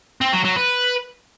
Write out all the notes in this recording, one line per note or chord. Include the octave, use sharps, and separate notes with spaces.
C4
F#3
F#3
B4